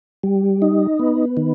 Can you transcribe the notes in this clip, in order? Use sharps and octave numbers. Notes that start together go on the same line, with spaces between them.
G3
D#4
B3
D#3